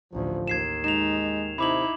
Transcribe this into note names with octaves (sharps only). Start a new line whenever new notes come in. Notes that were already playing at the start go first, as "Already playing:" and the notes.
A1 D2 F3
D#2 G#6 C7 E7
G#3 D#4 E7 F7
C3 D#4 E4 B5 D6 F#7